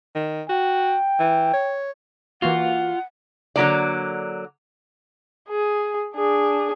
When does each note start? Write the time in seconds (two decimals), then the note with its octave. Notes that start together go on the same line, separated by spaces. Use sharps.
0.15 D#3
0.49 F#4 G5
1.19 E3
1.53 C#5
2.42 E3 A#3 F4 F#4 F#5
3.56 D3 F#3 A#3 D5
5.49 G#4
6.15 D4 G#4